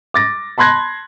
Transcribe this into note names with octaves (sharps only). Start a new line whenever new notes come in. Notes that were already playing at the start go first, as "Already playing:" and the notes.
D6 A6 A#6
A5 B5 C6 F#6 G#6 A#6